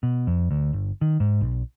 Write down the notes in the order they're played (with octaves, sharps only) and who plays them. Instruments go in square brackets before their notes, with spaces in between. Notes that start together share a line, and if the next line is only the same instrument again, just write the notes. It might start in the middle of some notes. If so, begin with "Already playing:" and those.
[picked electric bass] B2
F2
D2
G1
D#3
G#2
B1